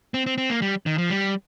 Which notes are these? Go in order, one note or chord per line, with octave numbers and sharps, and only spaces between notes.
C4
C4
C4
A#3
G3
D#3
F3
G3